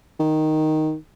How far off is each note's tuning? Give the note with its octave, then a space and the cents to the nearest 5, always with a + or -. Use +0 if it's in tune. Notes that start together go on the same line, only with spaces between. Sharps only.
D#3 +0